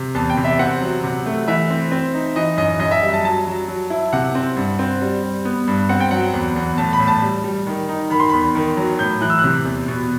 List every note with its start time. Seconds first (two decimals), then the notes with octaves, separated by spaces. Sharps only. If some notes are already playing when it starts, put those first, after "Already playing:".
Already playing: C3
0.15 E2 A5
0.30 G5
0.37 C3
0.44 E5
0.59 C4 F#5
0.81 F#3
1.03 C3
1.26 A3
1.48 E3 E5
1.70 C4
1.92 C4
2.14 D#4
2.36 E3 D#5
2.58 F#2 D#5
2.80 F#2 D#5
2.91 E5
3.02 G3 E5
3.13 A5
3.24 F#3 A5
3.47 F#3
3.68 F#3
3.90 E4
4.13 C3 F#5
4.35 C4
4.57 G2
4.79 C4
5.02 G3
5.23 G3
5.45 B3
5.68 G2
5.89 C4 F#5
6.01 G5
6.11 F#3 F#5
6.33 E2
6.56 E2
6.78 A2 A5
6.93 B5
7.00 A2
7.08 A5
7.22 G3
7.44 G3
7.67 D#3
7.89 D#4
8.10 D#3 B5
8.20 C6
8.30 E2 B5
8.55 D#3
8.77 F#3
8.99 A2 G6
9.21 E3 F#6
9.30 E6
9.39 F#6
9.44 C3
9.65 E2
9.88 B2